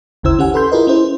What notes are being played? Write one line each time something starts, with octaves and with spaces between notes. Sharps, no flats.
G#1 D#2 C#3 E4 C5 E6
C#4 G4 F#5 G#5
A4 B4 B5 C6 G6
E4 F4 G#4 A#4 B4 D#5
C#4 E4 C5